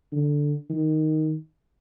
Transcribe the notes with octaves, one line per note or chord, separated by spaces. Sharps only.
D3
D#3